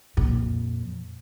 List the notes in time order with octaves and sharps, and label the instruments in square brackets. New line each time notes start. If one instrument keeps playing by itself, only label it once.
[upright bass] F2 A#2